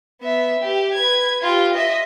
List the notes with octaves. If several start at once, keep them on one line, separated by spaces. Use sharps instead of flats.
B3 E5
G4
B4 G#6
F4 G4
D#5 E5